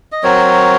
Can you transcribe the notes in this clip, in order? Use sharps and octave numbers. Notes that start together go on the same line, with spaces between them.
D#5
F#3 C4 F#4 A#4 C#5